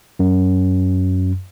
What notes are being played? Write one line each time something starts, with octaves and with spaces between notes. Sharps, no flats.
F#2